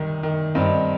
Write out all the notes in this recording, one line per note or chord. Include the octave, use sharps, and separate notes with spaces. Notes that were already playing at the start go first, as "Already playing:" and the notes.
Already playing: C2 D#3
D#3
G2 C4 D#4